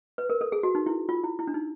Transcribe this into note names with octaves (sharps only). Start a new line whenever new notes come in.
B4
A#4
A4
G#4
F#4
D#4
E4
F4
E4
E4
D4
D#4